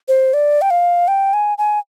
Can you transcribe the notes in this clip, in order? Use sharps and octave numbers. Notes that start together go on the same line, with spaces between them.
C5
D5
G5
F5
G5
G#5
G#5